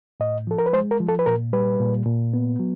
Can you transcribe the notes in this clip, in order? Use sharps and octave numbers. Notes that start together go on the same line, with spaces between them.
A2 D#5
F3 A4
A#4
B4
G#3 C5
A#4
F3
A4
B4
A#2 A#4
G3 B4
A#2
A#2
B3
F#3